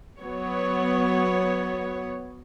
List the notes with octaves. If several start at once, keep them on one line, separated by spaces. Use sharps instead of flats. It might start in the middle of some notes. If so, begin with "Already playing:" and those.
F#3 B3 C#5